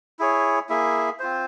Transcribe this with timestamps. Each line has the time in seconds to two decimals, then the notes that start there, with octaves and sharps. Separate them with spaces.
0.19 E4 G#4 C#5
0.69 A#3 E4 G#4 E5
1.19 C4 F4 C5